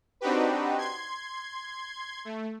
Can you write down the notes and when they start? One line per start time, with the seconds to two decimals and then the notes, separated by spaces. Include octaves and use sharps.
0.21 C4 D4 D#4 F#4 G4 B4
0.78 C6 G#6
2.25 A3